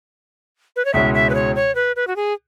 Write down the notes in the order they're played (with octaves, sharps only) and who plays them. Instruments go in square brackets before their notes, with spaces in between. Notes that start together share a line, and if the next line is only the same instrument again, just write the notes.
[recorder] B4
C#5
[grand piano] C#2 B2 G#3 C#4 E4 [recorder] E5
[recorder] E5
B4
C#5
C#5
B4
B4
F#4
G#4